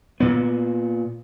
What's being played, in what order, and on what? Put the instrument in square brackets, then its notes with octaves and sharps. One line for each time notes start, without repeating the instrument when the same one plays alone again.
[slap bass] A#2 B3